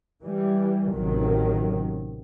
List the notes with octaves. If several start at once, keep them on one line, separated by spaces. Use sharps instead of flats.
E3 G3
A1 C3 D#3 F#3